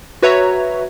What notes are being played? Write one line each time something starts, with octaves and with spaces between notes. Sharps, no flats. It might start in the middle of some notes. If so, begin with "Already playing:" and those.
F#4 B4 C#5 E5 A#5